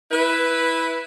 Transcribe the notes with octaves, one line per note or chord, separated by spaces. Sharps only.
E4 B4